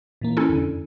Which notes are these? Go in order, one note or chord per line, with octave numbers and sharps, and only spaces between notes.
A#2 E3 A#3
C#4 E4 A4
F2 D3